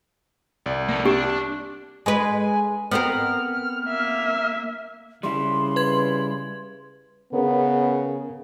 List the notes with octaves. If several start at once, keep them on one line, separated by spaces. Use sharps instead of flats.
C2 D5
A#3 A4
D4 G4
G#3 B4 G#5
B3 C4 A#4 F6
A#3 E5
C#3 G3 E4 C6
B4 G#6
C#3 B3 C#4 G#4 A#4